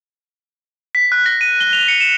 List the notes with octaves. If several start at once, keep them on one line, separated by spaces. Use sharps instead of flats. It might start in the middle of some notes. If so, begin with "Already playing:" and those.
B6
F#6
A#6
D#7
G7
F7
C#7
E7